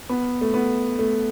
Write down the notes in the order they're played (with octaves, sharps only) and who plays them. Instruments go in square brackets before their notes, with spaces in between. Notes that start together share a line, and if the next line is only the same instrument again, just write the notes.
[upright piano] B3
A3
B3
A3